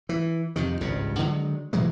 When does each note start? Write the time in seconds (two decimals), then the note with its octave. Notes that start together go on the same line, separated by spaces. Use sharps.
0.09 E3
0.56 F2 C3 D#3
0.81 G#1 C#2 G2 C#3
1.19 D3 D#3 F#3 G#3
1.73 B2 E3 F#3 G#3